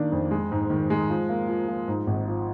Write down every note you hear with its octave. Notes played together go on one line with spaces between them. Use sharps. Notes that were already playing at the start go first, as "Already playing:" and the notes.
Already playing: D#3 A#3 D4
F2
G#3
G#2
D#3
G#3
F3
A#3
F3
F3
G#2
G#1
F3